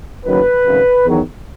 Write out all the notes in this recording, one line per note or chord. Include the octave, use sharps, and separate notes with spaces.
F#1 F#2 D#3 F#3 B4
G#1 F#2 C#3
E2 D#3 F#3